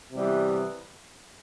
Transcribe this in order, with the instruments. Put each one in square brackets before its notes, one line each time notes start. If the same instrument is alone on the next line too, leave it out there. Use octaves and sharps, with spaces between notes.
[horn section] C3 E3 G3 B3